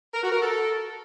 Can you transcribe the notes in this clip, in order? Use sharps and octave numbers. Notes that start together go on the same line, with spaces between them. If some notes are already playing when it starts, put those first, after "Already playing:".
A#4
F#4
A#4
A4